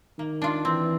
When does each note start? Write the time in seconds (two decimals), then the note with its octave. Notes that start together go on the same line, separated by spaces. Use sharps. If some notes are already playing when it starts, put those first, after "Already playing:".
0.19 D#3 A#3
0.42 D4 F4
0.64 E3 C4